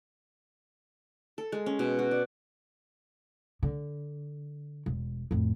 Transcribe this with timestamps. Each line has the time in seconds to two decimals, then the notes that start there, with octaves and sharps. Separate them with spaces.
1.38 A4
1.52 G#3
1.66 C#4
1.79 B2
1.99 F#4
2.11 D5
3.63 D3
4.86 E1
5.31 F2 A2